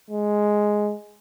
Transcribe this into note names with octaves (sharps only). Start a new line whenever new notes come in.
G#3